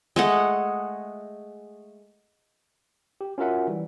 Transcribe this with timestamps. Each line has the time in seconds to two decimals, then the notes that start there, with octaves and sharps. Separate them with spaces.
0.16 G#3 A3 F#5
3.21 G4
3.38 C#4 F4 F#4 A#4 E5 F#5
3.68 E3 G3